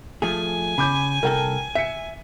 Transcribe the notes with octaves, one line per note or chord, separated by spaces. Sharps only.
F3 A3 G#4 G#5
C#3 B5 D6 G6
C2 A4 A#4 G5 A5
E5 B6 C#7